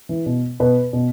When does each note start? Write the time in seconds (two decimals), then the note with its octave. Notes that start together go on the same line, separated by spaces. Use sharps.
0.09 E3
0.26 B2
0.60 B2 B4
0.93 B2